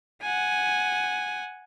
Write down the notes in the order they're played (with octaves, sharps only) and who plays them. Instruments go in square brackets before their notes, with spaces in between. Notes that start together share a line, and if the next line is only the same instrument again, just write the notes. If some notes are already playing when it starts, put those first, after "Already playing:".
[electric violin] F#5 G#5